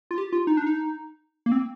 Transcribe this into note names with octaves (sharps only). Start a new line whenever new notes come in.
F4
G4
F4
D#4
D4
D#4
A#3
C4